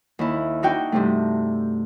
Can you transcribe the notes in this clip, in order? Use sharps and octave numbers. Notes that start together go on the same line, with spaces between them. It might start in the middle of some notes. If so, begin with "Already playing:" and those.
D#2 E4
D4 D#4 F#4 G5
G2 C3 A3